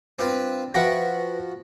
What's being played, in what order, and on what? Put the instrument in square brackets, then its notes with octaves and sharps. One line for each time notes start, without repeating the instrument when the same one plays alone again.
[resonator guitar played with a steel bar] G2 [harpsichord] C4 F4 B4
[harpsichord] F3 F#4 B5 [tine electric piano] B4 A#6 [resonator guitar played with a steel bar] E5 F#5 G5